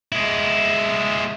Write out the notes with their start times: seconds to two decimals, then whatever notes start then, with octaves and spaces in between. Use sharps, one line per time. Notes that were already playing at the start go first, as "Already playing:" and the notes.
0.12 G#3 E4